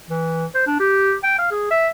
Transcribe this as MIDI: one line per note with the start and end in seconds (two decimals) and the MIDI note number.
0.10 0.45 52
0.55 0.64 72
0.67 0.78 62
0.80 1.14 67
1.23 1.34 79
1.38 1.51 77
1.51 1.67 68
1.71 1.88 76